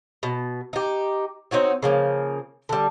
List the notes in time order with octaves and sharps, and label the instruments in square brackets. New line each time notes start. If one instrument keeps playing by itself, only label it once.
[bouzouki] B2
D#4 G4
C4 D#4 F#4 C#5
C#3 F3 A#3
D3 G3